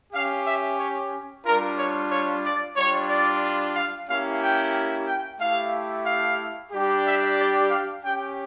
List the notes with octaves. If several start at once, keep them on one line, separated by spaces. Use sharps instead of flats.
C#4 G4 F5
E5
C#5
G3 D4 F4 A#4
C#5
C#5
D5
G3 D4 F4 C#5
D5
F5
A#3 C#4 E4 G4 F5
G5
G5
A3 E4 G4 F5
F5
G3 D4 G4
E5
D5
F5
C#4 G4 G5